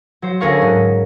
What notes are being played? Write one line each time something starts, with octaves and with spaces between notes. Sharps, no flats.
F#3 C5
D2 C#4 G#4 A#4 F5 C#6
G#2